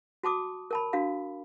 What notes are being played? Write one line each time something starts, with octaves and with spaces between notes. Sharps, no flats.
F#4 A5 D6 D#6
A#4 A5 B5
D4 F#4 F5